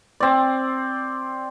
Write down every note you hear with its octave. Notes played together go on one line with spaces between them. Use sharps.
C4 D5